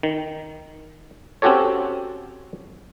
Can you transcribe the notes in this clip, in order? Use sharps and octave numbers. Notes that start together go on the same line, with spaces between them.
D#3
C4 C#4 F#4 G4 A4 C#5